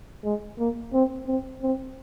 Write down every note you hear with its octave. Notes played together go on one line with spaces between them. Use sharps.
G#3
A#3
C4
C4
C4